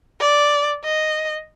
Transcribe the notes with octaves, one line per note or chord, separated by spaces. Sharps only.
D5
D#5